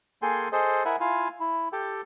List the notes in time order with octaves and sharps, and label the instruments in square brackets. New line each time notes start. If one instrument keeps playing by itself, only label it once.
[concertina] A#3 G#4 A4 G5 G#5 C6
G#4 A4 C5 D#5
E4 A#4 E5 F#5 G#5
E4 F4 F5 G#5
E4
G4 A4 G5